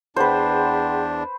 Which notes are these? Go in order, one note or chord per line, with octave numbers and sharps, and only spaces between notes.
E2 D4 G#4 B4 C5 F#5 G5